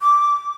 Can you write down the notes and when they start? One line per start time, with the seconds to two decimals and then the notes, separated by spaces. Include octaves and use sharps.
0.01 D6